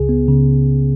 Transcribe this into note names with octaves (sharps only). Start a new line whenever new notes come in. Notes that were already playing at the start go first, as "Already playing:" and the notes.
Already playing: C#2 C#3 G#4
B3
C#3